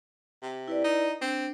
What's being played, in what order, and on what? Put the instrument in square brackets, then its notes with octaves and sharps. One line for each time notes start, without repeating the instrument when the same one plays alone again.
[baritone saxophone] C3
[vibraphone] E4 B4 D5
[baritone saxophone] D#4
[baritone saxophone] C4 [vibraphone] D4